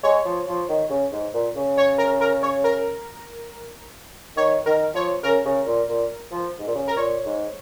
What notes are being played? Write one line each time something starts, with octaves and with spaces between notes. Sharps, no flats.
G#3 C#5
F3
F3
D#3
C#3
G#2
A#2
C#3
C#5
A#4
A#4
C#5
A#4
D#3 C#5
D#3 A#4
F3 C#5
C#3 A#4
C#3
A#2
A#2
F3
G#2
A#2
C#3
A#4
A#2 C#5
G#2